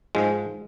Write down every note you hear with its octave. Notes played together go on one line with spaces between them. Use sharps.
G#2 F3 G#3